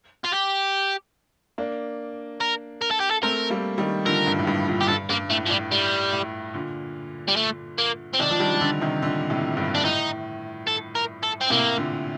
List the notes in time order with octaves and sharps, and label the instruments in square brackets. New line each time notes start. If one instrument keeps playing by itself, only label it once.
[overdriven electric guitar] F4
G4
[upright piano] A#3 D4
[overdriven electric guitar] A#4
A#4
A4
G4
A4
[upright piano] A3 C4 [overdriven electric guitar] A#4
[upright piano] G3 A#3
D#3 G3
[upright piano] D3 F3 [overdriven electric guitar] A#4
[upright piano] G2
A2
G2
G2 A#2
[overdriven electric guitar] G4
[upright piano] G2 [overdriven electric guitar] A4
[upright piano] G2 [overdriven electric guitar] A#3
[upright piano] A2 [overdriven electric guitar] A3
[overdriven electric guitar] F3
[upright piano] A2 [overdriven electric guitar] G3
[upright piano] A2 [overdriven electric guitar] G3
[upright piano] A2
A#2 D3
[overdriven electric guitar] G3
A3
A#3
C4
[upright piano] C3 D#3 [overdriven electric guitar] D4
[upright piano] F3
D#3 G3
G3
D3 F3
C3 D#3
A#2 D3
A2 C3
G2 A#2
[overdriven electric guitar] D4
[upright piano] A2 [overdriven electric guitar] D#4
[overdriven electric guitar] A4
A#4
A4
C4
[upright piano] A2 C3 [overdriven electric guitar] A#3
[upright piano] A#2 D3